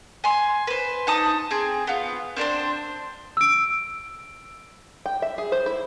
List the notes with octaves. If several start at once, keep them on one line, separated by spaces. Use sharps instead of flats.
G#5 C6
B4 C5
D#4 A5 D#6
C4 G#4
B3 F4
C4 D4 A#4 C5
E6 D7
G5
E5
G#4
C5
E4